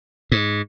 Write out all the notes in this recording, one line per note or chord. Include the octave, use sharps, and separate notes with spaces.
G#2